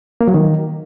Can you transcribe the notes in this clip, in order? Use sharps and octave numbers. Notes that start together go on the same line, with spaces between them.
A#3
F#3
D#3